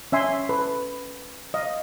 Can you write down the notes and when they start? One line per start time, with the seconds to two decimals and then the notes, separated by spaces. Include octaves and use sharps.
0.12 C#4 E5 G#5 C6
0.49 A4 B4
1.54 D#5 F5